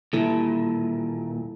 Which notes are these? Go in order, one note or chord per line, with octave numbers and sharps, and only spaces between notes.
D#2 A#2 G3 E4 A4